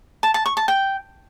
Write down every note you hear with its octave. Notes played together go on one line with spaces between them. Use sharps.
A5
A5
C#6
A5
G5